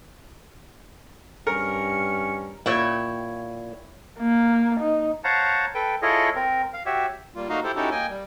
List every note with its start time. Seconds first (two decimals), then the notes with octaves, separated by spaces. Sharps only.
1.47 G2 C#4 A#4 C#7
2.66 A#2 E4 C#5 G5
4.19 A#3
4.80 D#4
5.24 C5 C#5 F5 F#5 A5 A#5
5.75 A4 B4 G5
6.02 E4 F4 G#4 A4 C#5 D#5
6.35 C4 A#4
6.74 F5
6.86 F#4 G4 C#5 E5
7.36 G3 A#3 F4
7.49 A3 A#3 D#4 F#4 D#5 F5
7.64 E4 G4 A4 C5
7.76 C#4 D#4 E4 F#4 G4 A4
7.91 A#3 D#5 G5 G#5
8.09 G3